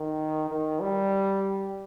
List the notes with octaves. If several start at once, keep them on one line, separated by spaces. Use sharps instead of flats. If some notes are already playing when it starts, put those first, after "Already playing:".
Already playing: D#3
D#3
G3